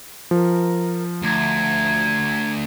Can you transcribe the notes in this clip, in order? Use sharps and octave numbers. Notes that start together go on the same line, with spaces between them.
F3 A#4
D2 A#5 G#6